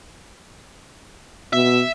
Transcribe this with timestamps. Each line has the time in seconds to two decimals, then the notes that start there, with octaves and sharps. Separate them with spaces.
1.53 B2 E5